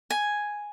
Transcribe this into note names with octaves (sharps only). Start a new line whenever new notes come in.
G#5